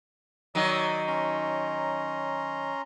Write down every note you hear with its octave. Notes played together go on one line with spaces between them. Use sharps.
D#3 F#3 D5 D#6
C#4 A#5 C6